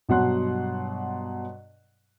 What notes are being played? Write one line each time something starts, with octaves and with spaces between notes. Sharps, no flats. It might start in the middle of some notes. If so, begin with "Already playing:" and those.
G2 B2 F#3 F#5 C6 F#6